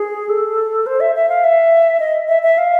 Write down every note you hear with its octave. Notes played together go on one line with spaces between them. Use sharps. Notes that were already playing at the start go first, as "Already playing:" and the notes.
Already playing: G#4
A4
C5
E5
E5
F5
E5
D#5
E5
E5
F5